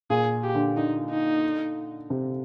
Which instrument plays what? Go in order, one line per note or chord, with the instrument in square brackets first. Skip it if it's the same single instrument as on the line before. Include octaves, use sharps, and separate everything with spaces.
[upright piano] A#2 [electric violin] G#4
[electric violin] G4
[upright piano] D3
[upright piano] D3 [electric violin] D#4
[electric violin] D#4
[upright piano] C3